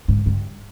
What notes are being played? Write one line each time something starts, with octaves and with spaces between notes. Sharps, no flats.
G#2
G2